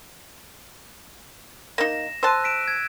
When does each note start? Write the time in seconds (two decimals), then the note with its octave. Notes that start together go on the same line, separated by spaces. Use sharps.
1.78 A#3 D#4 A#6 E7
2.23 C5 A5 E6 F#6 D#7
2.44 B6 D7 E7
2.68 G#6